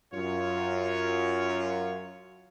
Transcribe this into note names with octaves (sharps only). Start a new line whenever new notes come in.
F#2 F4 C#5